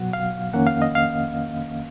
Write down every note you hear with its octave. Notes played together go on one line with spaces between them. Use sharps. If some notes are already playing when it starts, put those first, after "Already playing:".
Already playing: B2 F#3 B3 F#5
F5
F2 D#3 A#3 C#4 F#5
F5
D#5
F5